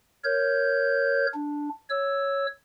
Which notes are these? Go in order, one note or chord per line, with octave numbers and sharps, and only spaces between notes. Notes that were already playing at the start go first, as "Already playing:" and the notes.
A#4 C#5 G6
D4
C#5 E6